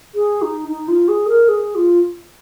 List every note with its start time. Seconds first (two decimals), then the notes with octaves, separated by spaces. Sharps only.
0.15 G#4
0.42 D#4
0.69 D#4
0.88 F4
1.08 G#4
1.28 A#4
1.48 G#4
1.75 F4